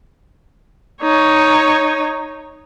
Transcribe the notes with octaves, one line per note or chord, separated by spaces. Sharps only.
D#4 C#5